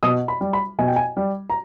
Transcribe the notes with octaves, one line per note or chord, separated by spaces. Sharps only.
B2 D#6
B5
G3
B5
B2 G#5
G5
G#5
G3
A#5